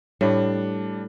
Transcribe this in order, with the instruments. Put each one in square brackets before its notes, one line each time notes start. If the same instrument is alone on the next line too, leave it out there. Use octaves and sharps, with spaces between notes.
[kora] A2 [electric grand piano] G3 D4